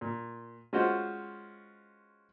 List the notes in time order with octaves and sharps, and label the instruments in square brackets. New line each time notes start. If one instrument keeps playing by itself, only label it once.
[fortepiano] A#2
G#3 C#4 F4 F#4 C5